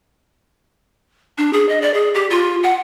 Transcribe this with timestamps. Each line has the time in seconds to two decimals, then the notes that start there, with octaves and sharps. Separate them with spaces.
1.38 D4
1.53 G#4
1.69 D#5
1.82 D5
1.94 G#4
2.15 G4
2.30 F4
2.63 F#5